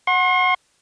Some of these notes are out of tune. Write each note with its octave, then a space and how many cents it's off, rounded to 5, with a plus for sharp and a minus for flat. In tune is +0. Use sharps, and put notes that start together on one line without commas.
F#5 -10 C6 +40